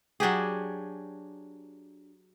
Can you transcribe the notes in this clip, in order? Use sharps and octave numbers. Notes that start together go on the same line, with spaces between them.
F#3 D4 G4 G#4